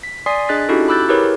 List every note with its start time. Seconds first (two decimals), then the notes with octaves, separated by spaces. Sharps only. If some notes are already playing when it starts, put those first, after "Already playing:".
0.03 B6
0.26 D5 G#5 C6 D#6 B6 C7
0.49 D4 G#4 D#5 F#6 A6 B6
0.69 C#4 D#4 E4 F#4 G4 A4
0.88 B5 D6 E6 F#6 G6 A6
1.09 E4 G4 G#4 A#4 B4 C#5